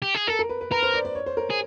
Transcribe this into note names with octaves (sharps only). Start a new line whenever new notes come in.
G4
G#4
A4 A#4
A#4
B4
B4
A#4 B4
C5
D5
D5
C#5
C5
A#4
G#4